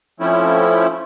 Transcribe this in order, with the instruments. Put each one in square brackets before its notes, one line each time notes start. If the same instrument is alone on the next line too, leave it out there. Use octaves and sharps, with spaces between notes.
[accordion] F3 A3 C4 C#4 E4